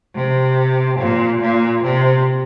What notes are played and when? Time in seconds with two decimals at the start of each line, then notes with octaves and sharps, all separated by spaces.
0.15 C3
0.99 A#2
1.41 A#2
1.83 C3